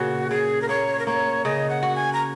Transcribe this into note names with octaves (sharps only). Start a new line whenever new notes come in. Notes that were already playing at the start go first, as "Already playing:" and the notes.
Already playing: A#2 C#3 F#4
C#3 G#4
A#4
A#3 C#5
A#4
A#3 C#5
C#3 D#5
F#5
F#4
G#5
A#5